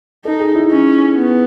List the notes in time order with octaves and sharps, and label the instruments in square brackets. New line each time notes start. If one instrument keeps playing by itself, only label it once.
[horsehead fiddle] D#4 [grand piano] A4
[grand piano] G#4
E4
[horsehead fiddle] C#4 [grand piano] D#4
[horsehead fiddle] B3